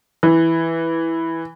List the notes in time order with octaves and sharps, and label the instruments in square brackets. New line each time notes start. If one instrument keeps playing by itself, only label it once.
[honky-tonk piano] E3